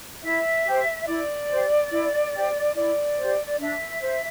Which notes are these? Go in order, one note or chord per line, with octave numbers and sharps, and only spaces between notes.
E4 E5
G4 C5
E4 D5
G4 C5
E4
G4 C5
E4 D5
G4 C5
D5
D4 E5
C5